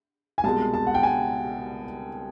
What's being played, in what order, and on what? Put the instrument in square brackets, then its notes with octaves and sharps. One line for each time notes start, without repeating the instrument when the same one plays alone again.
[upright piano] G#5
C2 B2 G#3 A5
A5
F#5
G5
G#5